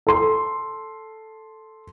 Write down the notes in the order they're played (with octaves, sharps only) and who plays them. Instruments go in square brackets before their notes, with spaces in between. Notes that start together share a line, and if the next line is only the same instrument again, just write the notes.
[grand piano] A4 C6